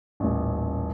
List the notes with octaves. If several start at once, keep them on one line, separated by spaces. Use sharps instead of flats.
D#1 A1